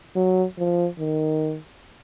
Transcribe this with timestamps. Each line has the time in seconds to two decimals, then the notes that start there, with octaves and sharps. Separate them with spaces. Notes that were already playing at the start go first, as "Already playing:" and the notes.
0.16 F#3
0.58 F3
0.99 D#3